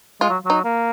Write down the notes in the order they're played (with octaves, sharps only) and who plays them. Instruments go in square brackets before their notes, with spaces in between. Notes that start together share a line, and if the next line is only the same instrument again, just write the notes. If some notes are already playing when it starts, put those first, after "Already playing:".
[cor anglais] G#3 [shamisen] F4
[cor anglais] F#3
[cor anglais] F#3 [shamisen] D#4
[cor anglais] A#3